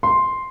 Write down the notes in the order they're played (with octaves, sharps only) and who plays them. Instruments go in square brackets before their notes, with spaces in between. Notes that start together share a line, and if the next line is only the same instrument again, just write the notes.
[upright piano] C6